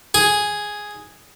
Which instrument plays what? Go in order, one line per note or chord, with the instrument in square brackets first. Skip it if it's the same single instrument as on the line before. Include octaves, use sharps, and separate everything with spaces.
[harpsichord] G#4